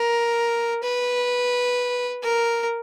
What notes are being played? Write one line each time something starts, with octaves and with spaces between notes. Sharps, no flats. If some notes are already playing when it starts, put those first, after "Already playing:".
Already playing: A#4
B4
A#4